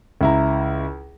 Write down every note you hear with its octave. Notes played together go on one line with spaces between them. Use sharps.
C#2 E4 A#5